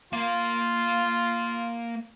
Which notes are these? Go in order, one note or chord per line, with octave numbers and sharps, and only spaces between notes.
A#3 F4 F5